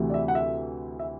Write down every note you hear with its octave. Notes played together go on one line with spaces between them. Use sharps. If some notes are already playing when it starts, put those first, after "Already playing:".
Already playing: D2 C3 E3 A3 E4
D5
E5
F#5
E5
E5